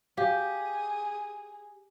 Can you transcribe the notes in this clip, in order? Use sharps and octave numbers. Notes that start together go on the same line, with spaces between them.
G4 G#4 F5